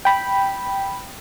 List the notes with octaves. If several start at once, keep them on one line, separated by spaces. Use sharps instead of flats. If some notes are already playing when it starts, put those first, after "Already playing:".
G5 B5